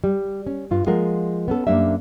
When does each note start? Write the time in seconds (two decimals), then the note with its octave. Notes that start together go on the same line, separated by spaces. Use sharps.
0.04 G3
0.47 C#4
0.71 G2 F4
0.86 F3 G#3 A#3 F4 A#4 F#5
1.48 B3 C#4 A4
1.67 F#2 G3 A#3 D4 D5 E5